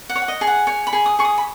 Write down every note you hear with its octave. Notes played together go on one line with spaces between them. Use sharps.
F#5
C#5
F#5
D#5
G#4
F#5
C#5 G#5
B5
G#4
D#6
G#4 C#6
D#6
B5